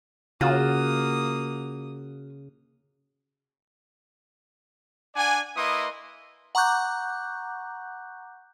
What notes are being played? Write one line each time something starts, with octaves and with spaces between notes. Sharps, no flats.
C#3 A#3 F4 F#4 D#6
D4 D5 F#5 G#5
A#3 E4 B4 D#5 C6 D#6
F#5 A#5 C#6 D6 F#6 G6